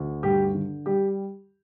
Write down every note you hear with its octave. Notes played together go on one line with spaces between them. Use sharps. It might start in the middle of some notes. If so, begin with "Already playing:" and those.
Already playing: D2
G2 G4
D3
G3 G4